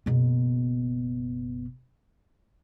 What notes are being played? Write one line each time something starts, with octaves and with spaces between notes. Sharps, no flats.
F#1 B2